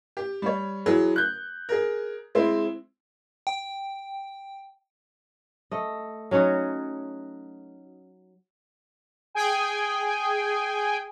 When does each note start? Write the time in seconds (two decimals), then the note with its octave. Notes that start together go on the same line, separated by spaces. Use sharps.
0.17 G4
0.42 G3 C#5
0.86 E3 F#3 G#4
1.16 F#6 G6
1.69 G#4 A#4
2.35 G#3 C4 E4
3.47 G5
5.71 A3 D#5
6.31 F#3 C#4 D#4 F#4
9.35 G#4 G5 G#5